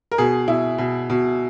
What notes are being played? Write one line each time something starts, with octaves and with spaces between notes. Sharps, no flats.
A#4
B2 G#4
B2 E4
B2
B2